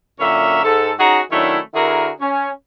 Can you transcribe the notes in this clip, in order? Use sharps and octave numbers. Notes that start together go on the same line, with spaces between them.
F#2 A#2 D3 C#4 A#4 E5
G#2 A4
C#4 D#4 F#4 G#4 F#5 A#5
D#3 F#3 A3 C#4 D4 E4
D3 E4 F#4 G#4 A#4
C#4